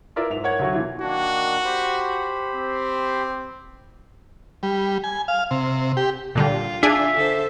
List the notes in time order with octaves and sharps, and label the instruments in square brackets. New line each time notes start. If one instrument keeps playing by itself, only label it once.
[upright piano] E4 F4 A#4 B4 D5 E5
G#2 E5 F7
A#4 C#5 F#5 G#6
D2 F#3 F#4
B2 E3 F4
[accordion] D#3 A#3 D4 [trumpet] F#4
[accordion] G4 C5 B5
[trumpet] C4
[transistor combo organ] G3
G#5
F5
C3
G4
[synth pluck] A#2 D3 G3 [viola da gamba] F4
[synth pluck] D4 G#4 G#5 [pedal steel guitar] E5
[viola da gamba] D3 A4 C5